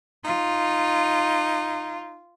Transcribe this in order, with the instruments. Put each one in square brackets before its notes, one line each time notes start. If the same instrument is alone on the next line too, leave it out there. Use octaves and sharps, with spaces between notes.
[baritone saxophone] D#4 [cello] F4